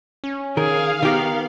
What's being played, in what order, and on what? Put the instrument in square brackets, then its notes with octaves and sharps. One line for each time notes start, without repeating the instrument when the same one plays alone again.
[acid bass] C#4
[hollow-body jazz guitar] D#3 A#4 [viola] G#4 [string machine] F5
[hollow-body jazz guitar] D#3 G4 [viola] B3 [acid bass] A#4